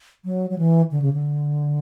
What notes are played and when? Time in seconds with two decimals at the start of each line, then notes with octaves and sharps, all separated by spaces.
0.25 F#3
0.50 F#3
0.58 E3
0.91 D3
1.02 C#3
1.13 D3